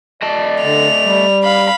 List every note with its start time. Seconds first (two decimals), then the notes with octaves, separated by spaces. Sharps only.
0.22 A3 D5 D#5 A5
0.63 D3 F7
1.05 G3
1.44 F5 B5